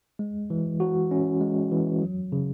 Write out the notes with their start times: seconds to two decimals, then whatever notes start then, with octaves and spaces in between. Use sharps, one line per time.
0.19 G#3
0.50 E3
0.80 F#4
1.11 C#4
1.41 G#3
1.72 E3
2.02 F#3
2.32 C#3